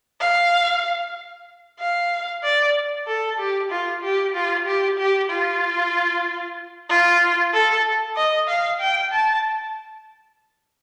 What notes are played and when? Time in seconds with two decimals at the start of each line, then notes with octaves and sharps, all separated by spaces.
0.21 F5
1.80 F5
2.44 D5
3.07 A4
3.39 G4
3.71 F4
4.03 G4
4.35 F4
4.66 G4
4.98 G4
5.30 F4
6.89 F4
7.54 A4
8.17 D#5
8.48 F5
8.81 G5
9.13 A5